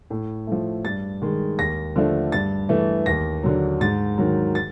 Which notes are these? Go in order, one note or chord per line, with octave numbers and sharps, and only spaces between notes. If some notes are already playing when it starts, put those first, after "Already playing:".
A2
F3 A3
G2 A6
D#3 G#3
D#2 A#6
D3 F3 A3
G2 A6
E3 A3
D#2 A#6
D3 F#3
G#2 A6
D#3 F#3
A6